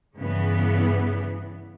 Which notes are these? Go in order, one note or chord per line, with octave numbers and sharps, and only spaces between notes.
G2 C#3 E3 B3